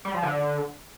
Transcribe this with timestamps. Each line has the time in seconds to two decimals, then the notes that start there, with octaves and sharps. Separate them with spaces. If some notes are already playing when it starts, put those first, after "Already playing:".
0.05 G3
0.14 F3
0.23 D3